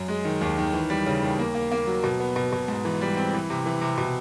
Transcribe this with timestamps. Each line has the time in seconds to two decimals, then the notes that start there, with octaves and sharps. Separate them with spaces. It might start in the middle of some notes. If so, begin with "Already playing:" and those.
Already playing: F#2
0.08 G#3
0.25 D#3
0.41 D#2
0.58 D#3
0.73 E3
0.90 G3
1.06 C#3
1.23 D#2
1.39 A#3
1.55 A#3
1.72 A#3
1.87 F#3
2.04 B2
2.20 B3
2.36 B2
2.52 B2
2.68 G#2
2.85 E3
3.01 G3
3.17 C4
3.34 E3
3.50 C3
3.66 E3
3.81 C3
3.98 B2